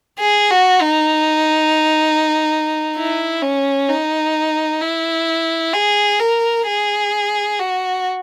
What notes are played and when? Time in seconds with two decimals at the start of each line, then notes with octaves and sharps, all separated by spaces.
0.19 G#4
0.50 F#4
0.81 D#4
2.97 E4
3.42 C#4
3.89 D#4
4.81 E4
5.73 G#4
6.19 A#4
6.67 G#4
7.59 F#4